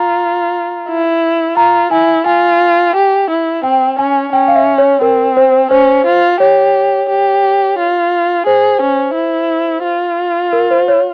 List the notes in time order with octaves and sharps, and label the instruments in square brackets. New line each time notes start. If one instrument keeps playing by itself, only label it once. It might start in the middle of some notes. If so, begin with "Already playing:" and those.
Already playing: [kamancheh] F4 [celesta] A#5
[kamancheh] E4
[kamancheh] F4 [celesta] A#5
[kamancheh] E4 [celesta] G#5
[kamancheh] F4 [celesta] G#5
[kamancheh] G4
E4
[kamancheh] C4 [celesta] G5
[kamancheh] C#4 [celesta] G#5
[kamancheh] C#4 [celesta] G5
[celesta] F5
E5
C#5
[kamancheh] C4 [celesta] A#4
[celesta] C5
[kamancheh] C#4 [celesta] C5
[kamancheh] F4
[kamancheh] G4 [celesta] C#5
[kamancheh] G4
F4
[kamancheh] G#4 [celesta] C5
[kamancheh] C#4
E4
F4
[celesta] A#4
C5
C#5